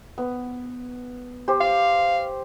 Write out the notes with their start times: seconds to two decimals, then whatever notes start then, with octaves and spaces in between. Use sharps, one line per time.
0.18 B3
1.48 G4 C5
1.61 F5